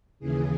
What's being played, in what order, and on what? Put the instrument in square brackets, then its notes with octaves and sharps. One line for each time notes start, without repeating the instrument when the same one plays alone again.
[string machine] D#2 C#3 E3 G#4